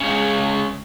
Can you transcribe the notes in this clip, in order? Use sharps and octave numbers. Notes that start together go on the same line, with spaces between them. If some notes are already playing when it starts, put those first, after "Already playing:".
C#2 C#3